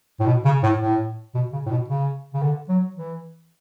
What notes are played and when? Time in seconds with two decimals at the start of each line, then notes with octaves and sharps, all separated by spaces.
0.20 A2
0.26 B2
0.45 C#3
0.63 A2
0.80 A2
1.34 B2
1.53 C#3
1.66 A2
1.71 B2
1.88 C#3
2.34 C#3
2.42 D3
2.69 F#3
2.96 E3